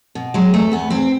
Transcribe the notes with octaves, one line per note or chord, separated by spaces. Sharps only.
B2
F#3 G#3
E2 A3
E2 B3
E2 C4